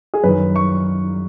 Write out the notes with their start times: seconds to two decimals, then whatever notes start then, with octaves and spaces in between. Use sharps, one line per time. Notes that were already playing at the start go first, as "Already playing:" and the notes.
0.14 G#4
0.24 F#2 D#3 B4
0.56 C#6